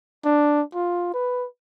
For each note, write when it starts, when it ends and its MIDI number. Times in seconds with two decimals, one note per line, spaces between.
0.25 0.62 62
0.74 1.13 65
1.14 1.47 71